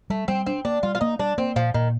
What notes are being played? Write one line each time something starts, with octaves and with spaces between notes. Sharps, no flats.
G3 A3
G3 C4
C4 D4
A#3 D4
G3 F4
F4
A#3 D#4
G3 D4
A#3 C4
A#2 F3
A#2 D#3